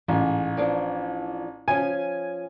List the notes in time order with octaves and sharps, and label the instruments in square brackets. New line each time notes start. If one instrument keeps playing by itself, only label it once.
[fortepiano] A1 [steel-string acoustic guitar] G#2 G#5
[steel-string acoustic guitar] E3 F3 D4
[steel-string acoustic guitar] F3 C#4 [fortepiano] G#5